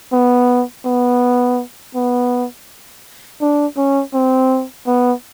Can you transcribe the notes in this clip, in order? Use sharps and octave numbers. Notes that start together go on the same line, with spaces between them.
B3
B3
B3
D4
C#4
C4
B3